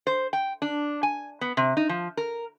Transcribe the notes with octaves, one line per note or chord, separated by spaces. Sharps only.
C5
G5
D4
G#5
B3
C3
D#4
F3
A#4